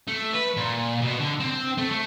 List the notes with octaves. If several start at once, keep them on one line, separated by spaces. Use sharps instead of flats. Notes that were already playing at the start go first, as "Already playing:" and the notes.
A3
B4
A#2
B2
D3
C4
A3
A3